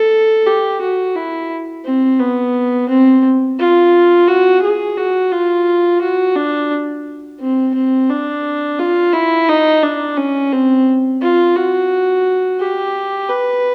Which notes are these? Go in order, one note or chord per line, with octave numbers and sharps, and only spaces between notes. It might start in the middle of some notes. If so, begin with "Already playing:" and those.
Already playing: A4
G4
F#4
E4
C4
B3
C4
F4
F#4
G#4
F#4
F4
F#4
D4
C4
C4
D4
F4
E4
D#4
D4
C#4
C4
F4
F#4
G4
B4